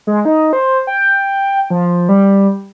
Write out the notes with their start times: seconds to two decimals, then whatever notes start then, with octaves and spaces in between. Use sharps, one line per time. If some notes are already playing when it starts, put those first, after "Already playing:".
0.07 G#3
0.25 D#4
0.53 C5
0.87 G5
1.70 F3
2.09 G3